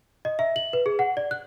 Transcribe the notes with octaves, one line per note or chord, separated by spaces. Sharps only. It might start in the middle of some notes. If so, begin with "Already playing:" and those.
D#5
E5
F#7
B4
G#4
F#5
D5
F#6